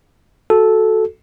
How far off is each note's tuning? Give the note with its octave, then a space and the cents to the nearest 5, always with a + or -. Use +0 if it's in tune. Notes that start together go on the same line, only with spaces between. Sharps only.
F#4 +0 A4 -10